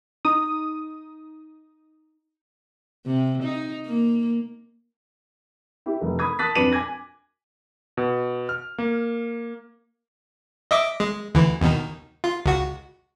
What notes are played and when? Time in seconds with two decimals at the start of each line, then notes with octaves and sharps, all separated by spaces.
0.25 D#4 D#6
3.07 C3
3.43 D#4
3.86 A#3
5.86 E4 G4
6.01 F1 A3
6.19 B5 D#6 G#6
6.39 A5 D#6 F#6 A6 B6
6.55 F2 D4 B4 D6 D#7 F#7
6.71 G#5 D6 G#6 A#6
7.97 B2
8.49 F6
8.78 A#3
10.71 D#5 E5 D6
11.00 G#3
11.35 D2 E3
11.61 D#2 B2 D#3
12.24 F4
12.45 C#2 F#4